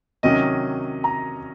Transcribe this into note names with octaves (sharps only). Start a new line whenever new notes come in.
C3 D#3 F#3 C#4 D#5
A#5